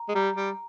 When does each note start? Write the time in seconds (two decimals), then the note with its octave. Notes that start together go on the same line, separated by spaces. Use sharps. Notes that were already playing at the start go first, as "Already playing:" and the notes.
Already playing: A#5
0.09 G#3
0.15 G3 A#5
0.36 G3